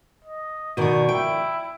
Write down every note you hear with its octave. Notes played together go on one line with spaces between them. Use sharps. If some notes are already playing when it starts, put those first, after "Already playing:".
D#5
B2 D#3 F3 D4 F#4 D5 C#6
E4 G5 D7